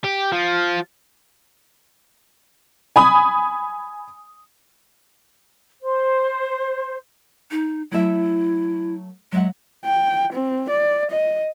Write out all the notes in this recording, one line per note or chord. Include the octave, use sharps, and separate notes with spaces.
G4
F3
G#5 B5 D#6
C5
D#4
F#3 A3 E4 E5
F#3 G#3 E5 F#5
G5
C4
D5
D#5